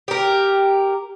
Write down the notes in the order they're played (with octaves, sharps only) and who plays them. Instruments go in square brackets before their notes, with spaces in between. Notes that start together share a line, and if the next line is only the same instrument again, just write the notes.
[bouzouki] G4 A#4